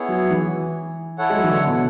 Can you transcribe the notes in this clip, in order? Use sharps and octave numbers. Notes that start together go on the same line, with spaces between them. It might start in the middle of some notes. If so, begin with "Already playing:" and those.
Already playing: B3 E4 G#4 C#5
F#3
E3
E4 A4 C#5 F#5
G#3
F#3
E3
D3
B2